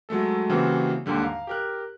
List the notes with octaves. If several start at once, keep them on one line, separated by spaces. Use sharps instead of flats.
F#3 G#3 A3 A4
C#3 E3 G3 A#3 C4 F#4
D#2 G#2 D3 G3
F5 A#5
G4 A#4 F#6